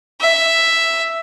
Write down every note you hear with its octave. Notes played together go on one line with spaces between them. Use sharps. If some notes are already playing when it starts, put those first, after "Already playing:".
E5